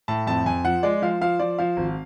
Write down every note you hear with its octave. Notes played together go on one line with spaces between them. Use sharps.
A2 A5
F2 A5
F2 G#5
F3 F#5
G#3 D5
F3 F5
F3 F5
F3 D5
F3 F5
G#1